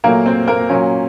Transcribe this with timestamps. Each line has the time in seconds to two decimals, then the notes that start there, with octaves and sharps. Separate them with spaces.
0.04 A#2 F#3 A3 A#3 A#4
0.26 C4 C5
0.47 A#3 A#4
0.69 A#2 F#3 A#3 C#4